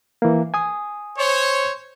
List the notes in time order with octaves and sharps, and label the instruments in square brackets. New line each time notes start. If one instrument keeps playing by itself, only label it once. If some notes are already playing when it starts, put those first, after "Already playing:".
[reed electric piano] E3 A#3
G#5 D#6
[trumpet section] C5 C#5